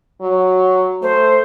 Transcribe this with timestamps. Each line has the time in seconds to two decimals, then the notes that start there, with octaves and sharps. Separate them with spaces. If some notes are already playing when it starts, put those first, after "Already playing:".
0.21 F#3
1.02 A3 C5